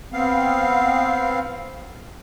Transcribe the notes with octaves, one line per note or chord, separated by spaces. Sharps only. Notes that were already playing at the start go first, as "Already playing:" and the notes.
B3 C4 F5